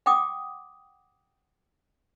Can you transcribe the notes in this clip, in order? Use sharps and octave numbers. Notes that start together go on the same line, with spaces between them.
F#5 G5 D6 D#6